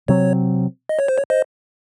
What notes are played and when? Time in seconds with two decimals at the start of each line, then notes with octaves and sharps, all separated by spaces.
0.08 C3 F#3 C4 C#5
0.89 D#5
0.99 C#5
1.08 C5
1.18 C#5
1.30 C5 D#5